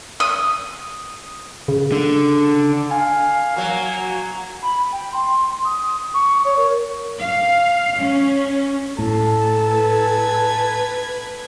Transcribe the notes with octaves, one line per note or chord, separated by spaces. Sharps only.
D#6
C#3
D3
F5 G#5
F#3 A#3 F#4
B5
G5
C6
D#6
C#6
C#5
A#4
F5
C#4
A2 A4 A5
B4 G#6